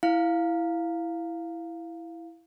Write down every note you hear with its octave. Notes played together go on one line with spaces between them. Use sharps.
E4 F5